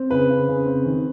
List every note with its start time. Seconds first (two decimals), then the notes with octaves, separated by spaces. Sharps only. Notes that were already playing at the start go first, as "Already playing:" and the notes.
Already playing: C4
0.11 C#3 B4
0.30 C#3
0.48 C#3
0.66 C4
0.85 D#3